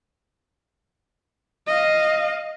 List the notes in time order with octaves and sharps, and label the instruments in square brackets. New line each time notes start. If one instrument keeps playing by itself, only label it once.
[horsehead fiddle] D#5 F5